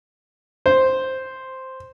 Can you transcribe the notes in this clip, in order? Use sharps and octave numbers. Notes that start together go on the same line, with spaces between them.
C5